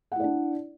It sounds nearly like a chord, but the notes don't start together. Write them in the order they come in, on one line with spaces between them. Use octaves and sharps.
F#5 E4 D5 D4